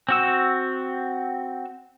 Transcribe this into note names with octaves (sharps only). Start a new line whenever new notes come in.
C4 F#4 E6